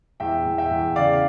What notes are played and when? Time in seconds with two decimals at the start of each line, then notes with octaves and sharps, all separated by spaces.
0.20 E2 E5 G5
0.46 E2
0.58 E5 G5
0.71 E2
0.96 C#3 D5 F5
1.13 F5